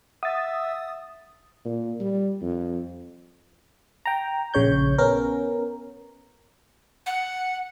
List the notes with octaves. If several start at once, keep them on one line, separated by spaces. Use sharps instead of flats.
E5 F#5 D#6 A6
A#2
G3
F2
G5 A#5
A#1 C#3 C#5 G6
B3 C#4 A#4
F#5